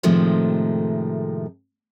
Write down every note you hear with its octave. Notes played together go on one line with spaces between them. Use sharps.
A2 C3 D#3 F3 G#3 A3